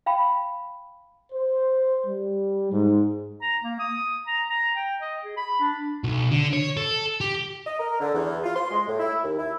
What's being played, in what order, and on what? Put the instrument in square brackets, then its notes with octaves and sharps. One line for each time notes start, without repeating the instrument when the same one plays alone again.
[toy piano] F5 G5 B5
[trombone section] C5
G3
G#2
[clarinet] A#5
A#3
D#6
A#5
A#5
G5
D#5
G#4
B5
D4
[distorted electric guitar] B1
D3
C#5
A4
G4
[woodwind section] D#5
A#4
D3
E2
F4
C6
G#3
A2
E4
D#2
E4